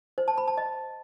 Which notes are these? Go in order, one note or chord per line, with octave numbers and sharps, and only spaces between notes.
C5
A5
B5
A5
D#5